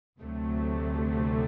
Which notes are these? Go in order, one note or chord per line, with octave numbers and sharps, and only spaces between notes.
D2 C3 F#3 A3